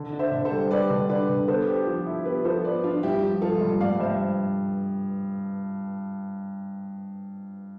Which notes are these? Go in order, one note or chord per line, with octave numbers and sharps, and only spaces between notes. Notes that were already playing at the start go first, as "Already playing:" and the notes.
Already playing: D3
D4
C5 E5
D3
A4 C5
G3
G3 B4 D5
D3
D4 B4 D5
D3
B3 A4 C5
G4
F3
E4
B3 G4 B4
F3 A4 C5
B3 B4 D5
F3 D4 F4
G2 E4 G4
F3
F3 F4 A4
G2
G2 D5 F5
G2 C5 E5